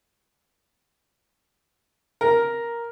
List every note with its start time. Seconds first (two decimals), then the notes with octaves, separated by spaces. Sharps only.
2.21 A#4